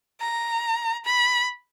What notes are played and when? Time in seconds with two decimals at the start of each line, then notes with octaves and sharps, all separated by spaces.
0.21 A#5
1.05 B5